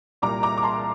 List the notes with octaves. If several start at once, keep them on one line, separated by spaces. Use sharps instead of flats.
C2 A#2 G3 A#5 D6
A#5 D6
D6
A5 C6